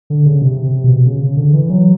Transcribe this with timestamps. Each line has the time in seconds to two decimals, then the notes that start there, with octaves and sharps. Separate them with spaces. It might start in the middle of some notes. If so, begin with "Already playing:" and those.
0.10 D3
0.26 C#3
0.42 C3
0.63 C3
0.84 B2
1.05 C#3
1.21 C#3
1.37 D3
1.53 E3
1.69 F#3